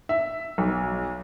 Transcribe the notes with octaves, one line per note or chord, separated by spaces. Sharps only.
E5
B1